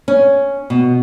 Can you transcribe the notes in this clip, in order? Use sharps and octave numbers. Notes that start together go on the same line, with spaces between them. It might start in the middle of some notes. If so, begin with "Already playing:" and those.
C#4
B2